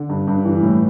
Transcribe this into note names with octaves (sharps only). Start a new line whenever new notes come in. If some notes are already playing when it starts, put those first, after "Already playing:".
Already playing: D3
G2
G2
E3
A2